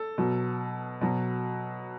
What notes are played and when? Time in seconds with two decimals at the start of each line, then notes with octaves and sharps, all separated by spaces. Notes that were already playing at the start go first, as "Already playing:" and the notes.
Already playing: A4
0.18 B2 F#3
1.01 B2 F#3